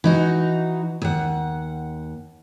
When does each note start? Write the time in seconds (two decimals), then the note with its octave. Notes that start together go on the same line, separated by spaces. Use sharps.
0.04 E3 D#4 F#4
1.02 D#2 F#5